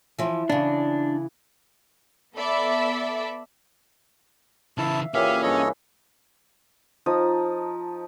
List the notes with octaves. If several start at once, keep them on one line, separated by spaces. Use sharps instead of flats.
E3 F3
C#3 E3 D4
B3 A4 D5 E5 B5
C#3 E3 E4 E5 F5 A5
A#2 C#3 E3 C#4 G4 E5 F5
G2 G#4 A4 C#5 D#5 B5
F3 D#4 D#6